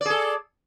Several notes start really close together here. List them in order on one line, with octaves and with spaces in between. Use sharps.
D5 G#4 A4